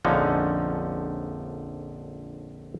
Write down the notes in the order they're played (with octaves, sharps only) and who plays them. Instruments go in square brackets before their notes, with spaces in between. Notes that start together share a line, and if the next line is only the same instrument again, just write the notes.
[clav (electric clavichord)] A#1 F2 D3 F3 C#4 D#4